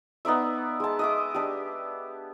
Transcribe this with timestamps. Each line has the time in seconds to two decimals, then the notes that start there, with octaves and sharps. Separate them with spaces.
0.25 B3 D#4 D5 E5
0.80 G#3 A5
0.99 D#5 E5 D6
1.34 D4 G4